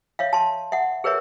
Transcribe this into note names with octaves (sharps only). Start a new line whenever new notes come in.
C#5 E5 F5
A5 C6
E5 F#5
G#4 A#4 B4 C#5 E5